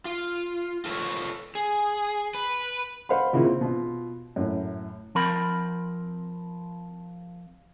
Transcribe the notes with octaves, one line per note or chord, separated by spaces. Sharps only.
F4
F4 A4 B4 C#5
G#4
B4
C5 F5 F#5 B5
A#2 C#3 A#3 E4 F4
C4
B2 F4
F#2 A2
F3 C4 A#4 B5